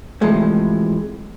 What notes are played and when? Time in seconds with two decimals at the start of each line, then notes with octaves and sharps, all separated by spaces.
0.21 A2 C3 E3 F3 G#3 A3